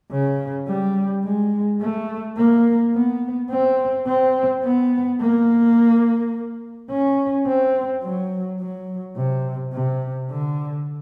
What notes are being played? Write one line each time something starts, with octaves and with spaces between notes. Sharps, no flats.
C#3
G3
G#3
A3
A#3
B3
C4
C4
B3
A#3
C#4
C4
F#3
F#3
C3
C3
D3